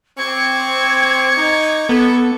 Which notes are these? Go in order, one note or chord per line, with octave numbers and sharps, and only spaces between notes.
C4 C#6 D6 G#6
D#4
B3 A4